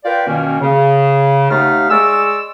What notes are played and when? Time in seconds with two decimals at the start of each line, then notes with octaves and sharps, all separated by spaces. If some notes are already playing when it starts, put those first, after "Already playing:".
0.05 F4 A#4 B4 D5 G5
0.27 F#2 B2 D#3 A#3 C#4
0.61 C#3
1.51 D#2 A3 B3 D#4 F5 F6
1.90 G#3 D5 C#6 E6